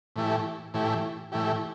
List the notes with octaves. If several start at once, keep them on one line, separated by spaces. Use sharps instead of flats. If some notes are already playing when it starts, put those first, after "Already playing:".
A2 E3 A3 E4 G4
A2 E3 A3 E4 G4
A2 E3 A3 E4 G4